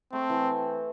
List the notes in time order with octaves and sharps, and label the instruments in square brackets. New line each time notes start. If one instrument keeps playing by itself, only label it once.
[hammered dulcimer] A3 [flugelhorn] C4
[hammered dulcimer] E3